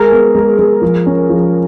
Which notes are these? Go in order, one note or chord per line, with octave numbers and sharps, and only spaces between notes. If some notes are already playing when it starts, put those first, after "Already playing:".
Already playing: G#3 G#4 A#4
B3
G#3
G#3
F3
C#4
F3